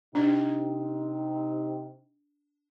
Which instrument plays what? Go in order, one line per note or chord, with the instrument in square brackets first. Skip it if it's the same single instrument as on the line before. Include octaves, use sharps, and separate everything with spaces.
[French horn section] C3 D#4 [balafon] D4